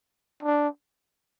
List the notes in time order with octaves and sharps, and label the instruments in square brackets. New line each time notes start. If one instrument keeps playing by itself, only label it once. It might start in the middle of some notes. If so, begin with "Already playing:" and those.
[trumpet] D4